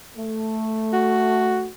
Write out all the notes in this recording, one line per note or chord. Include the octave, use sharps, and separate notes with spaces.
A3
F#4